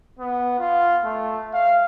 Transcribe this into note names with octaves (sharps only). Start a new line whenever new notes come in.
B3
F4
A3
F5